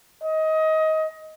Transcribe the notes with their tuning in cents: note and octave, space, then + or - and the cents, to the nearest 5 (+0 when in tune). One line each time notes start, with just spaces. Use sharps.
D#5 +20